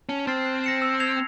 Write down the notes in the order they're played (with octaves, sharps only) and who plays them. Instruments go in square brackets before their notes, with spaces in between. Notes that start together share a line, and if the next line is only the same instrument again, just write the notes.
[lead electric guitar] C#4 [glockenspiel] A5
[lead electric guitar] C4 [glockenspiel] C6 F6 A6 C7
[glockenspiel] F#6
A#6 C#7 E7
E6
G#6 C7 F7